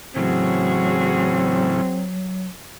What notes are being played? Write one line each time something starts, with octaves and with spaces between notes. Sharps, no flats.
A2 C#3 E3 F#3 C4 F#4 G#4